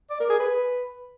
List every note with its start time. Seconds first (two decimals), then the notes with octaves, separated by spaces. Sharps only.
0.10 D5
0.20 A#4
0.30 G#4
0.39 B4